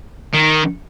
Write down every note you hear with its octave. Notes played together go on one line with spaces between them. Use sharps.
D#3